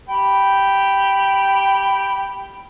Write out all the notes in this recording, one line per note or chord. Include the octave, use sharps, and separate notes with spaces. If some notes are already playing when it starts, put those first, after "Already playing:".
G4 G5 B5